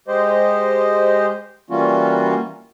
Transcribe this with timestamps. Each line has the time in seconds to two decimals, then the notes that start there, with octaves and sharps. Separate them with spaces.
0.08 G#3 G4 C5 D#5
1.70 E3 G3 A#3 C#4 F4 F#4